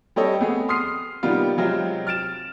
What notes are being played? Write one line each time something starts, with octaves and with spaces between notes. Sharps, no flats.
G3 C4 G4 A4 C#5 D#5
A3 B3 G#4
C6 D#6 F6 C7
C3 D#3 G3 A#3 B3 F4
C3 F#3 G#3 C4 F4
F6 A6 D7 E7